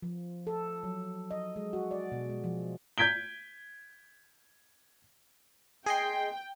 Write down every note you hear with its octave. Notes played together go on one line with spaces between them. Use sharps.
F3
A4
F#3
D#5
G#3
F#4
D5
B2
G#3
F3
G6 G#6 B6 D7 G7
G#4 D#5 G5 C6